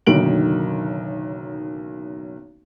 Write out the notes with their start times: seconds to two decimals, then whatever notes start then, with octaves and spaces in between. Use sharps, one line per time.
0.06 F#1 B1 D3 D#3 D7 F#7